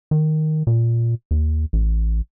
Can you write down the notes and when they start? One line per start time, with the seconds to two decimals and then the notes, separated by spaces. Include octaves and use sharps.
0.11 D#3
0.67 A#2
1.31 D#2
1.73 A1